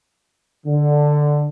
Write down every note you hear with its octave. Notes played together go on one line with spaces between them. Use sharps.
D3